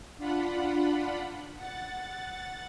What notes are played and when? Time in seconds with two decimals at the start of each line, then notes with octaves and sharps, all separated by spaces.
0.18 D4 F4 F#5 B5
1.56 F#5 A6